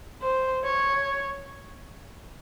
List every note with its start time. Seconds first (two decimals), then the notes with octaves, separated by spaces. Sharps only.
0.22 C5
0.64 C#5